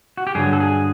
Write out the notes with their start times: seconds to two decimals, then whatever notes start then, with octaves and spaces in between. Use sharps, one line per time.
0.17 F#4
0.27 G4
0.35 G2 D3 F#3 G#4
0.53 A4
0.60 G#4